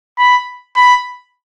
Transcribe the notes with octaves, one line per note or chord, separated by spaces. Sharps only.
B5
B5